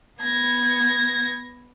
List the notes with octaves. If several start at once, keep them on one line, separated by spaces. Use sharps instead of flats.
B3 G#6 A#6